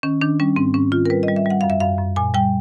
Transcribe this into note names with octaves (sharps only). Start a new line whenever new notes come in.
D#3 C#4
D#3 D4
G3 C#4
G#2 C4
G#2 C#4
D#3 F4
A#4
G3 B4
D#5
G3
E5
G3 F#5
F#2 F5
E5
F#2 F5
F#2
A#2 G#5
G3 G5